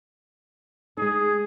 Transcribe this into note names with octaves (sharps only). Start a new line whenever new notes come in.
G#3 D#4 G#4